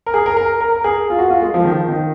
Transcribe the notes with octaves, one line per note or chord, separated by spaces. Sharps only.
A#4
G#4
A#4
A#4
A#4
A#4
G#4
F4
F#4
F4
G#3
F3
D#3
F3
D#3